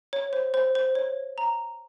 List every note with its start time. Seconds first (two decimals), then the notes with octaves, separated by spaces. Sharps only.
0.13 C#5
0.33 C5
0.54 C5
0.75 C5
0.95 C#5
1.38 A#5